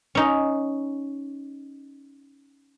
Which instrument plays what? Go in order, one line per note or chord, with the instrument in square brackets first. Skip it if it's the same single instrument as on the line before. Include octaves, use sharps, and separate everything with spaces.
[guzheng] C#4 D#4